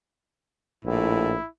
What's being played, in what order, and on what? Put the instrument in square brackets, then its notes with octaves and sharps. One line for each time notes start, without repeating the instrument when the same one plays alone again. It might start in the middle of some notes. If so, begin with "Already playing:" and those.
[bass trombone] A#1 [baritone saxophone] A2 [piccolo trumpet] E4